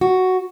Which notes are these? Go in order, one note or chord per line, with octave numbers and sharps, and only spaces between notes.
F#4